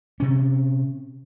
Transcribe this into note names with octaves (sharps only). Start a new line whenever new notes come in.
C3 C#4